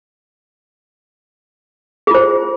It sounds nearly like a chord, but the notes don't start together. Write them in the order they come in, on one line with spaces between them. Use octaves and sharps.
G#4 F4 C5